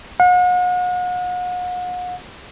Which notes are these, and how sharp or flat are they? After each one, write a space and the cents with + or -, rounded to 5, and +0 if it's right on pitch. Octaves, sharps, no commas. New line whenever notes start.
F#5 -40